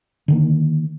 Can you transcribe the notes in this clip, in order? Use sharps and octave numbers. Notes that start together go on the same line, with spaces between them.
D3 D#3 A#3